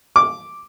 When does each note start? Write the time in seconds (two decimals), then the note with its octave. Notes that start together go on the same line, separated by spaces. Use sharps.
0.16 D6